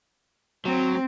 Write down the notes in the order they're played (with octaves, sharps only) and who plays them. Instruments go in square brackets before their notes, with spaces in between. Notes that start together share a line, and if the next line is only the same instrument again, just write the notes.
[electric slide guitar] F#3 [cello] C4